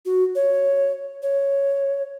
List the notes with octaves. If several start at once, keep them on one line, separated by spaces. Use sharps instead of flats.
F#4
C#5
C#5